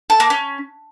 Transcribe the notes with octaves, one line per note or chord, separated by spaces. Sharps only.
A4
A#3
C#4